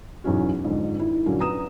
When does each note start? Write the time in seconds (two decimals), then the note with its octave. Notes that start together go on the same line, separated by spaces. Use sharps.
0.24 B1 E2 F#3 C#4 F#4
0.64 F2 G#2 D3
0.98 D#3 E4
1.26 A#2 D3 F#3 A#3 C#4
1.40 B3 A#5 D#6 E7